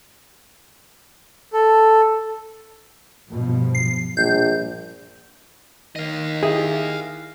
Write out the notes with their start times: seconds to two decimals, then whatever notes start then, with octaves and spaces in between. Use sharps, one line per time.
1.53 A4
3.30 G2 B2 F3
3.75 C7
4.17 A#1 G3 G6
5.96 D#3 D#5 F5
6.43 E4 G4 G#4 E5